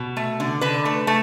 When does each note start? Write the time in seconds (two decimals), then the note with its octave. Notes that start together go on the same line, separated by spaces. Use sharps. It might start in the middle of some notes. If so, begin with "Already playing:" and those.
Already playing: B2
0.17 A3
0.40 D3
0.61 D3 B4
0.85 A3
1.07 A3